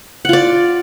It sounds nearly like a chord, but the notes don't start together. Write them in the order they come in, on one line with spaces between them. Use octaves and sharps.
F#5 F4 D5